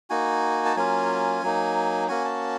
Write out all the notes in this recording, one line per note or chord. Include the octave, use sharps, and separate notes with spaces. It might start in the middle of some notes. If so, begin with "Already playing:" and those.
A#3 D#4 F#4 G#5
A5
F#3 A#3 C#4 F4 G#5
F#3 A#3 D#4
A#3 C#4 F#4 G#5
A5